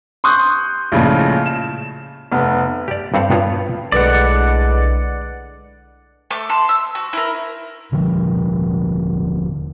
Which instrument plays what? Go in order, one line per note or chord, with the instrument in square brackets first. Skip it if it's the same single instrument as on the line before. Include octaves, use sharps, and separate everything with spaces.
[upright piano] C6 C#6 D#6 F#6 G6
A#1 A2 C#3 F3 G#3
E7
F1 B3
[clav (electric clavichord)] G4 D5
G2 C4 A4 F5 F#5
G2 B3 F4 C#5 A#5
[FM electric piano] B1 B4 C#7 [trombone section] A2 D3 G#3 [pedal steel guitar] D5 F#5
[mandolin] A3 D6
A5 C6
E6
F#4
E4 A#4
[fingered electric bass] D#1 D3 F3